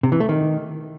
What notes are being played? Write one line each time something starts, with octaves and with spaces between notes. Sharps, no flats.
C3
E3
A3
D#3